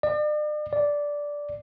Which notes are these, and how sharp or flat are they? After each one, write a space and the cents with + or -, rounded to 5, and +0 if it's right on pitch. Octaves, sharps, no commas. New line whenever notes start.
D5 +40
D5 -10